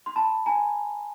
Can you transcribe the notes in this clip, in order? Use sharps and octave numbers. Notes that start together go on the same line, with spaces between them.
C6
A5 B5
G#5 A#5